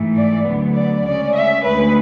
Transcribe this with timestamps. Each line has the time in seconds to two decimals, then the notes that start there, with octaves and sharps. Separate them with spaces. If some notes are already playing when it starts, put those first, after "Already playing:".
Already playing: G#2 E3 A3
0.15 D5
0.46 D2 D3 F#3 B3
0.75 D5
1.05 C#3 G#3 C#4 D5
1.34 E5
1.64 D2 D3 G#3 B4